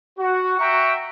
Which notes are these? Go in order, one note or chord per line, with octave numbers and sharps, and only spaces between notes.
F#4
E5 F#5 G5 A#5 C#6